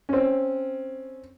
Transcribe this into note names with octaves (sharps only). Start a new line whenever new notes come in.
C4 C#4